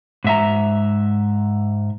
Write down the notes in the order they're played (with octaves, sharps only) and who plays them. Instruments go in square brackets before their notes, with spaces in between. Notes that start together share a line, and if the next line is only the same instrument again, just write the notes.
[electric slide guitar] G#2 E5 A#5